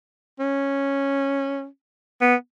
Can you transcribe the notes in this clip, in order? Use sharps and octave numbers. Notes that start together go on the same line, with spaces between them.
C#4
B3